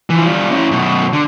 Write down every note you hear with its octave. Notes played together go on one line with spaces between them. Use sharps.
E3 F3
G3 F4
C#4 E4
F#2 B2
D3